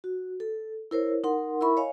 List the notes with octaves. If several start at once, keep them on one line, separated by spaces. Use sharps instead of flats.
F#4
A4
E4 A#4 C5 C#5
D#4 A#4 F#5 C6
E4 A#4 E5 B5 C#6
C#5 D#5 F5 G#5